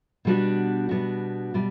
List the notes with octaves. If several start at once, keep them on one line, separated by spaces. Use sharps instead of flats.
B2 G3 B3 D4 F#4
B2 G3 B3 D4 F#4
B2 G3